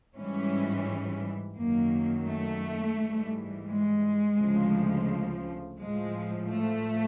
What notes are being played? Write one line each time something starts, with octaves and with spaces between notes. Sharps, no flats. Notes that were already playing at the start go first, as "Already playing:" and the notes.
G#2 E3 G3 C#4
F#2 D#3 F#3 A#3
A3
G#2 E3 G3
G#3
D2 C#3 F3
A2 F3 G#3
A3